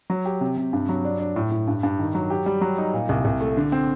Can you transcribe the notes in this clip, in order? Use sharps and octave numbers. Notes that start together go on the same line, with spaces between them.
F#3
G4
C3
C3
G2
F#3
D4
D4
A2
A2
G2
G2
D#3
F#3
G4
G3
F#3
D#4
A#2
C2
C2
A3
D3
C4